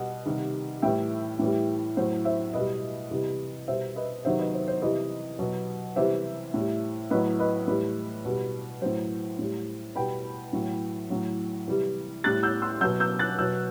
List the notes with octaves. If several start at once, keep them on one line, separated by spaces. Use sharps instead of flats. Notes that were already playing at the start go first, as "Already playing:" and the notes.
Already playing: B2 G3 D#5 F#5
C3 D#3 G3
A2 E3 G3 E5 G5
A2 E3 G3
A2 F#3 C5
C5 E5
B2 G3 B4 D#5
C3 E3 G3
B2 G3 C5 E5
B4 D#5
C3 D#3 F#3 C5 E5
B4 D#5
C5
C5
C3 E3 G3 B4 D#5
B2 F#3
C3 E3 G3 C5 E5
A2 G3
A2 F#3 B4 D#5
B4 D#5
A2 E3 G3 B4
B2 G3
A2 F#3 C5
A2 G3
B2 G3 G5 B5
A2 F#3
A2 F#3
C3 E3 G3
A2 G3 F#6 A6
E6 G6
C6 E6
B2 F#3 E6 G6
E6 G6
F#6 A6
B2 F#3 E6 G6